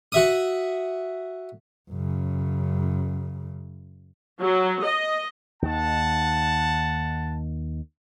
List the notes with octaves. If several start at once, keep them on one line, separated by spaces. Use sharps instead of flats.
F#4 E5 D#6
F#2 C#3
F#3
D#5
D#2 D#3 F#5 A5